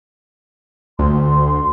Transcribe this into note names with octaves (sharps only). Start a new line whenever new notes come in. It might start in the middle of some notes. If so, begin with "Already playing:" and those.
D2 C6